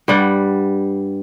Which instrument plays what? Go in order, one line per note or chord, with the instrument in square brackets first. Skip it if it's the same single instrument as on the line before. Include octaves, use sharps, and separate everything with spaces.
[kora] G2 G3 F#5